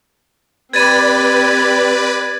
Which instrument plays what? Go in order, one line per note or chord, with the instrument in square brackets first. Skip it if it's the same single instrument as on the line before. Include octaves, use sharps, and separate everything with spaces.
[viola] C4 G4 [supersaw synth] B4 D5 B5 [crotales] G#6 A6 D#7